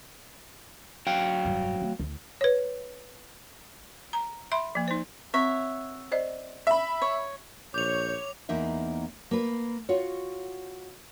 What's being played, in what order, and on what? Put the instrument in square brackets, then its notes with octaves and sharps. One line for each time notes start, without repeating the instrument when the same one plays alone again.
[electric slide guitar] F#3 F5 G5
[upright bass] F1 G2
A3 C4
D2 E4
[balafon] B4 C#5
A#5
E5 B5 C6
F3 A#3
D#4 C5
[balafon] C4 [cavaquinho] C#5 E5 F#5
[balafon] C5 D5 D#5
[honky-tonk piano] E5 B5
[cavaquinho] C#5
[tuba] A#1 [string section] C#5 [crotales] D6 F7 [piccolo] G6
[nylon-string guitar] E2 A#3 D#4 E5
A#3 B4
F4 F#4 C#5